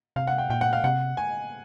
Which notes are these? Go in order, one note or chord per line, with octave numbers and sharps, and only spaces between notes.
C3 F5
F#5
G5
A#2 G5
F#5
F5
C3 F#5
G#5